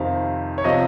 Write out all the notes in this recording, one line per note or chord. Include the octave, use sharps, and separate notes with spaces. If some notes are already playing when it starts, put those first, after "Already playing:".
Already playing: F2 C3 D#3 F5
C#5
C3 F3 D#5